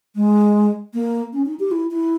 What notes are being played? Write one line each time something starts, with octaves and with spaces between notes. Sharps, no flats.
G#3
A#3
C#4
D#4
G4
E4
E4